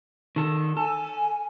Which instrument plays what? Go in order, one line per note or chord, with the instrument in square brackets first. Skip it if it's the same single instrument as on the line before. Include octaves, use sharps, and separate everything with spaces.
[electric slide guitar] D#3 A4
[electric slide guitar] A4 [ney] G#5